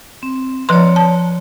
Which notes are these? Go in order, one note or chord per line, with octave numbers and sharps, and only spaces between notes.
C4
F3 B4 C#5 D5 A#5 C6
A5